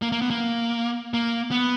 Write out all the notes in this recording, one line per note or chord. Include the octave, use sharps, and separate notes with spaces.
A#3
A#3
B3
A#3
A#3
B3